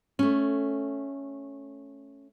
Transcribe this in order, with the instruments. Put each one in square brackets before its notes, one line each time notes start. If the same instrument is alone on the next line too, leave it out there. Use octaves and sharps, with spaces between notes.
[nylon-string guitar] A3 C#4